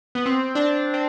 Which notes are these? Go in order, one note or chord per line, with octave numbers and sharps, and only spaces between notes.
B3
C4
D4
C4